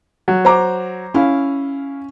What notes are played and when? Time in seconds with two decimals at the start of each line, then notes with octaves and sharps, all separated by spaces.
0.28 F#3
0.45 C5 A#5 D6
1.14 C#4 E4 F5